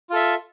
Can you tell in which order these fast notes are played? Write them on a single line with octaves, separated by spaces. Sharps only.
F4 A4 E5